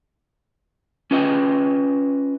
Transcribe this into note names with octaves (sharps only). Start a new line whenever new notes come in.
C#4 F4 B4 D#5 G5